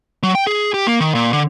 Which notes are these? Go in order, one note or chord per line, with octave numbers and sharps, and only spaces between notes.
F#3
G5
G#4
G4
A#3
D#3
A#2
D3